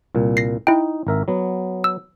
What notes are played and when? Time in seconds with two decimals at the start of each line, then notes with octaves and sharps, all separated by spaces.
0.15 C2 A#2
0.37 A#6 C7
0.67 D#4 E4 G5
1.07 G#1 A#4 E5
1.28 F#3 B3
1.84 E6